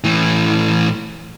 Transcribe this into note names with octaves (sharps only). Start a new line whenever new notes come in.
A2 E3